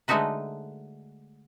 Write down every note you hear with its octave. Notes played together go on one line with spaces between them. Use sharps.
D3 G#3 A3 D#4 F#4 B4